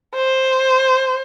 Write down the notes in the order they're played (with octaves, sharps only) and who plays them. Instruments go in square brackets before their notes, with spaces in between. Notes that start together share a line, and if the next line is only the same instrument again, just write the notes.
[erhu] C5